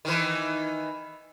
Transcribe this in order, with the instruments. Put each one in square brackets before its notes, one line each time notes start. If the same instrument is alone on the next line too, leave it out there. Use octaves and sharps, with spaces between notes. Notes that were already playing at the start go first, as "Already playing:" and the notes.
[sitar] D#3 E3